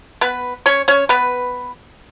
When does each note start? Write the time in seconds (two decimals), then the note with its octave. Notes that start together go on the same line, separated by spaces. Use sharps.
0.21 B3 B4
0.66 C#4 C#5
0.88 C#4 C#5
1.09 B3 B4